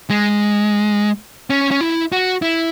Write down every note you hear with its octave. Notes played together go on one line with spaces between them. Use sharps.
G#3
C#4
C#4
E4
F#4
E4